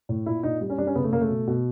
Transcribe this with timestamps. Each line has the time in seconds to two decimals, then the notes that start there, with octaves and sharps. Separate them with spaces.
0.09 A2
0.26 A#2 E4
0.43 A#2 D#4
0.61 G3
0.70 C#4
0.78 G3 D4
0.87 C#4
0.95 C#3 B3
1.04 A3
1.12 C#3 A#3
1.21 A3
1.30 B2
1.47 B2